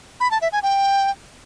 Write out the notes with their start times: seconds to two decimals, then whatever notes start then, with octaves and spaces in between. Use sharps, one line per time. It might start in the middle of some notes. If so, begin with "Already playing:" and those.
0.20 B5
0.31 A5
0.42 E5
0.52 G#5
0.63 G5